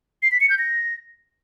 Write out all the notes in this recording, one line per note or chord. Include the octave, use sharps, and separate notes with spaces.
C7
B6
C#7
G6
A#6